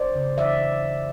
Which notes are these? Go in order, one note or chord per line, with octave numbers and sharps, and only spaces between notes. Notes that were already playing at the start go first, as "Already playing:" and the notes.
Already playing: C5 D5
C#3
E3 D5 E5